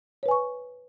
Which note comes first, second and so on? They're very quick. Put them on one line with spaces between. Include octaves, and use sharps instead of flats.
C#5 B4 G#5 C#6